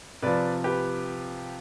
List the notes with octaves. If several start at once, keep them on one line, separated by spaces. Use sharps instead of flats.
C3 F3 B4 D5
G4 B4